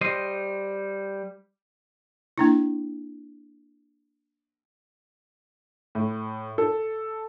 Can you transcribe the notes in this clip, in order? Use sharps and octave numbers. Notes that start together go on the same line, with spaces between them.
G3 C5 D#5
A#3 D4 E4
A2
A4